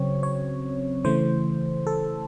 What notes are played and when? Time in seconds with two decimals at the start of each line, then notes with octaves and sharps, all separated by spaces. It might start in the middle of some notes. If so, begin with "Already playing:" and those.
Already playing: C#3 F#3 C4 C#5
0.23 C#5
1.04 C#3 E3 A3 C5
1.87 A4